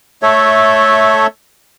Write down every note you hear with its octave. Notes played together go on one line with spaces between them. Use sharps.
A3 A4 C#5 E5